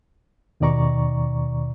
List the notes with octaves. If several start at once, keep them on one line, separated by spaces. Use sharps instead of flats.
D#2 B2 D#3 D5 A#5 C#6